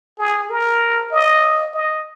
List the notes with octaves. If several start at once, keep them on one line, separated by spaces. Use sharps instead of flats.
G#4
A#4
D#5
D#5